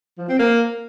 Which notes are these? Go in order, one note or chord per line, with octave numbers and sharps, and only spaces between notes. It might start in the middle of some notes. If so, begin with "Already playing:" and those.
F3
C4
A#3